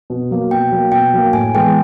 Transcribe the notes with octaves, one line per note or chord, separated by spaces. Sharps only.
B2
F#3 A#3
B2 G5
F#3 A#3
B2 G5
F#3 A#3
A2 G#5
E3 G#3 B3 G5